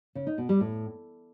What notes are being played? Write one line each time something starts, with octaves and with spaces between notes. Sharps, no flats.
C#3
D#4
B2
G3
A2